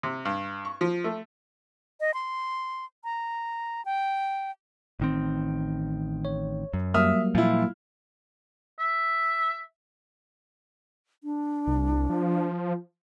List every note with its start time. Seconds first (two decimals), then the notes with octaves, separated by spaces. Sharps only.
0.03 C3
0.25 G2
0.65 C#6
0.81 F3
1.04 A3
2.00 D#5
2.14 C6
3.04 A#5
3.85 G5
5.00 A1 D#3 C4
6.25 C#5
6.74 F#2
6.94 F#3 G3 A#3 E5 D#6 F6
7.35 A#2 F3 E4 F4
8.79 E5
11.24 D4
11.67 C2
12.09 F3